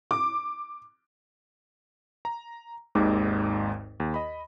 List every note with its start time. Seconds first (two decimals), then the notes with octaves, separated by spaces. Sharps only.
0.11 D6
2.25 A#5
2.95 G#1 D#2 G#2 D#4 D6
4.00 D#2
4.14 D#5 B5